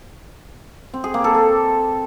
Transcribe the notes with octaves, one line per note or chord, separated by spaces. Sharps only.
C4
G#4
A#3
A4
A4